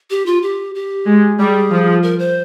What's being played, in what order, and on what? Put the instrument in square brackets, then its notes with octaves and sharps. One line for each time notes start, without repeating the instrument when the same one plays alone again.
[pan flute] G4
F4
G4
G4
[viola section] G#3
[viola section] G3 [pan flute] G#4
[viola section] F3
[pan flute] A#4
C5